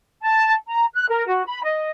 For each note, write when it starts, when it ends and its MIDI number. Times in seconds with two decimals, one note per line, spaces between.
0.22 0.53 81
0.67 0.85 82
0.94 1.05 90
1.09 1.25 70
1.28 1.44 66
1.46 1.60 83
1.63 1.90 75